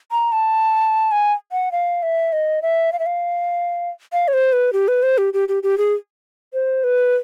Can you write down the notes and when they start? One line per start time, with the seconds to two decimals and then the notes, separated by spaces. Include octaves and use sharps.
0.12 A#5
0.32 A5
1.12 G#5
1.52 F#5
1.72 F5
2.03 E5
2.33 D#5
2.62 E5
2.93 F5
2.99 E5
3.06 F5
4.13 F5
4.28 C#5
4.33 C5
4.53 B4
4.73 G4
4.88 B4
5.03 C5
5.18 G4
5.34 G4
5.48 G4
5.63 G4
5.78 G#4
6.53 C5
6.84 B4